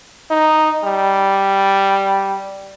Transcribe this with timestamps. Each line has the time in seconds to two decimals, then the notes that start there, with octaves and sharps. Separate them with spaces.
0.31 D#4
0.85 G3